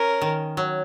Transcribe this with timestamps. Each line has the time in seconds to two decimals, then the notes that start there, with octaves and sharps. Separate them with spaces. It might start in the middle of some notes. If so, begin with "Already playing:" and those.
Already playing: C#4 A#4
0.21 D#3
0.57 F#3